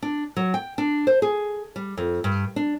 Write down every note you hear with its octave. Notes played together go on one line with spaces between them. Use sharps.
D4
F#3
G5
D4
C5
G#4
G3
F2
G2
D4